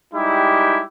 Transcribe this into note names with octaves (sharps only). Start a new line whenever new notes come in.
G3 G#3 D#4 E4 G4